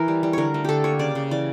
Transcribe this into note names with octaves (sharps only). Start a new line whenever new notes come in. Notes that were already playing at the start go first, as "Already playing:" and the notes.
Already playing: E3 A#4
G3
G3
D3 A#4 C#5
A3
D3 G4 A4
A#3 C#5
C#3 D5
C#3
E3 D5